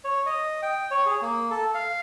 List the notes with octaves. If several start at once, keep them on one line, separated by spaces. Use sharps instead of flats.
C#5
D#5
G5
C#5
G#4
A#3
A4
F5